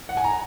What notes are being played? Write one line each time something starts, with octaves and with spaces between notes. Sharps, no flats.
F#5
G#5
A#5